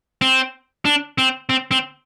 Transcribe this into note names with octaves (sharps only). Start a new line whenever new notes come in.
C4
D4
C4
C4
C4